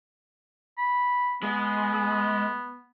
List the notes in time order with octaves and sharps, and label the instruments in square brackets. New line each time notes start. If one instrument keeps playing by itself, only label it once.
[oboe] B5
[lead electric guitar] G#3 [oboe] B3